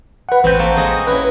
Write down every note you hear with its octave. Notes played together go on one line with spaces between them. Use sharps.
B4 F#5
A1 C4 F#4 B4 G6
A#3 A4
G#3 G#4 D#5
C#4 E4 B4